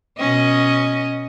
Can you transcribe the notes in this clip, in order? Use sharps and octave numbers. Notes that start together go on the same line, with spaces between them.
B2 C#4 D#5